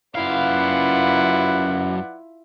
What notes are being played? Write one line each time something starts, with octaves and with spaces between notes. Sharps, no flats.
F#2 E4 F4 B4 D5 F5 F#5